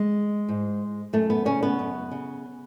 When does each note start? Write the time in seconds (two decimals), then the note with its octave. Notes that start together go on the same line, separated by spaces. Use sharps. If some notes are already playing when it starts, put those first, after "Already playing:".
Already playing: G#3
0.49 G#2
1.13 F#2 A3
1.30 B3
1.45 C#3 C#4
1.63 B3
1.79 F#2
2.11 C#3